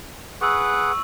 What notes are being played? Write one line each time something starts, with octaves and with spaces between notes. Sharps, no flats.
G#4 B4 F#5 C#6 E6